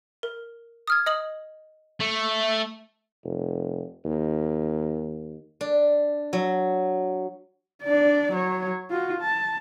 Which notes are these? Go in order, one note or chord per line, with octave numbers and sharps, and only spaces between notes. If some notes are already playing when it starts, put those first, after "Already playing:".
A#4
D#6 F6 G#6
D#5 D#6 F#7
A3
F1
D#2
D4
F#3
D4 D5
F#3 C#5
F4 F#4
A5